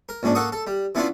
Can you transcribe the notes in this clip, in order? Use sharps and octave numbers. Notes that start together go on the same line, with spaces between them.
A#4
A#1 G#2 C#4 D4
A#3 A4 F#5 C#6 D#6
A4
G3
E3 B3 C#4 D4 E4 F4